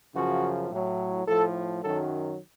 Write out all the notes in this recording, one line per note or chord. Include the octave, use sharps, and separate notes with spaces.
F#2 C#3 F3 F#4
A2 F#3
A2 F3 A4
F#2 D#3 F#3 A4